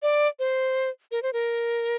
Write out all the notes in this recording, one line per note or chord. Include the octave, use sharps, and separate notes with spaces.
D5
C5
A#4
C5
A#4